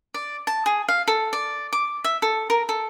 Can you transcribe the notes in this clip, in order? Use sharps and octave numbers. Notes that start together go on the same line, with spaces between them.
D5
A5
G#4
F5
A4
D5
D6
E5
A4
A#4
A4